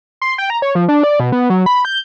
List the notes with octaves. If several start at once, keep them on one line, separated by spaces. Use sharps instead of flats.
C6
G5
A#5
C#5
F3
D4
D5
B2
B3
F#3
B5
G6